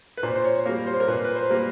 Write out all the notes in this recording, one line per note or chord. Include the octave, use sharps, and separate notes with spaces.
B4
A#2 C5
C5
C#5
G3 A#3
C5
A#4
A#2 B4
B4
C5
G3 A#3